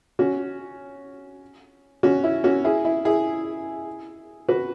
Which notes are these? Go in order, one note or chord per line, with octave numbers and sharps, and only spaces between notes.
C#4 F#4
C#4 F#4
E4
C#4 F#4
E4 G#4
E4
E4 G#4
F#4 B4